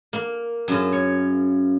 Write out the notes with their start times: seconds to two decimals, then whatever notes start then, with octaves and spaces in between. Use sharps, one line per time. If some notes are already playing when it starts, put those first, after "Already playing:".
0.13 A#3
0.68 F#2 C#3
0.92 C#5